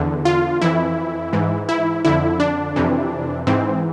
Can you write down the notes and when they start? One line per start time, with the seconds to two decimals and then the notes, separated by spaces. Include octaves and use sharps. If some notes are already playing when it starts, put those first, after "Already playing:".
Already playing: E2 D3
0.25 F4
0.62 F2 E3 E4
1.33 G#2 E3
1.69 E4
2.05 F2 D3 E4
2.40 D4
2.76 F2 C3 E3
3.47 G#2 E3 C4